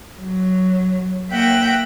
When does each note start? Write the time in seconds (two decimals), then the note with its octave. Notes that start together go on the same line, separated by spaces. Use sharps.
0.19 F#3
1.31 A#3 E5 F#5 G5 A#6